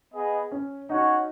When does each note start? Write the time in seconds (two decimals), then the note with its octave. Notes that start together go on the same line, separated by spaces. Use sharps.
0.13 B3 G#4 D#5
0.51 C#4
0.90 C#4 D#4 F#4 C#5 F#5